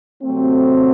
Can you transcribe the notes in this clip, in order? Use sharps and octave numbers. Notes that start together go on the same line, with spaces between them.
C3 F#3 A3 C4